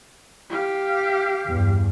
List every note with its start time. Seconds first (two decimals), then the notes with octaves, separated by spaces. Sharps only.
0.50 G4 F5
1.47 E2 G2